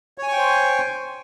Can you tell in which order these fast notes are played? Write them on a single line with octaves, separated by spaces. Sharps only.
C#5 G#5 C#6 G5 C5